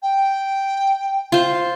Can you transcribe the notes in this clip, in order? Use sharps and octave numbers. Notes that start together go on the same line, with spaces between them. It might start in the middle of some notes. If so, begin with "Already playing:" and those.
G5
F4 C5